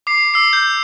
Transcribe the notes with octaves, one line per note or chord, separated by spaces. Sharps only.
D6 C7
D6 E6 C7
G6